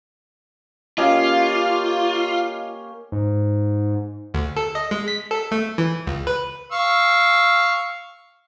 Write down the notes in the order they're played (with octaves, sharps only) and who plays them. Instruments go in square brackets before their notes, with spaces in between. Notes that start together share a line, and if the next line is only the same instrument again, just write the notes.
[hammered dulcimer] A#3 C#4 G4 [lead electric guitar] F4 [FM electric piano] D#5 F5
[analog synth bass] G#2
[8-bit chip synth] D2
A4
D#5
G#3
B6
A4
A3
E3
C#2
B4
[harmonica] F5 C#6 E6